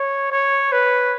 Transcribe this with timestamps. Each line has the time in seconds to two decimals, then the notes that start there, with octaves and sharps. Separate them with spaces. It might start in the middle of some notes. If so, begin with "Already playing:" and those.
Already playing: C#5
0.32 C#5
0.72 B4